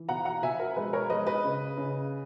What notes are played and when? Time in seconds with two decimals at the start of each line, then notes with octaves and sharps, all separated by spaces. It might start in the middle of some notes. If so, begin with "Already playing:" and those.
Already playing: E3
0.09 B2 F#5 A#5
0.25 F#5 A#5
0.43 B2 E5 G#5
0.60 A#4
0.76 G#3 B4
0.93 A#4 C#5
1.10 G#3 B4 D#5
1.26 B4 D#5
1.44 C#3
1.78 C#3